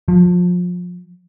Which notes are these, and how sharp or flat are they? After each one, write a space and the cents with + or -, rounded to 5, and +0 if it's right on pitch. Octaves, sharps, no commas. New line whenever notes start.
F3 +30